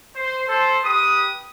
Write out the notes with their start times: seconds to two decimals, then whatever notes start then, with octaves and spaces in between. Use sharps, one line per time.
0.15 C5
0.48 A4 C5
0.84 G4 B4 D#6